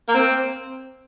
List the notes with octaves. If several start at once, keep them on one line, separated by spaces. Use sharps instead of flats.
A#3
C4